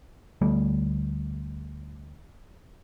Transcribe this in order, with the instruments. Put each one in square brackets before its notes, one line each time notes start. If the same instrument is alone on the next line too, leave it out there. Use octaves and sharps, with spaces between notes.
[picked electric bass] D2 G3 A3